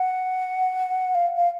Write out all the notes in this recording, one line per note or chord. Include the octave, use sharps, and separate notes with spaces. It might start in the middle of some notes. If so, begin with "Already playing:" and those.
Already playing: F#5
F5
F5